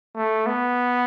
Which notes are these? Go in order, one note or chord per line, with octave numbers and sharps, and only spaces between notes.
A3
B3